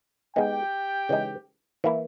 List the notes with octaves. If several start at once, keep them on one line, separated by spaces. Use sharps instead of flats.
G#3 B3 D#4 G4 G5
C#3 E3 G#3 D#4
E3 A#3 E4